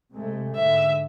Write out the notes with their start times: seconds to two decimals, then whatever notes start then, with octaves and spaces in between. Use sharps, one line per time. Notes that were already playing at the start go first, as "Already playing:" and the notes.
0.12 C3 G#3 A3
0.56 G#2 D3 E5